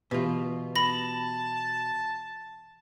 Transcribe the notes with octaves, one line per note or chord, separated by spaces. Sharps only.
B2 E3 F4 G4 B4
A5 B5 A#6